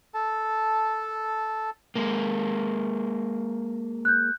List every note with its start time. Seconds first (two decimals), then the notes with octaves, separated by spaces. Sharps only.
0.14 A4 A5
1.95 G#3 A#3
4.05 F#6 G6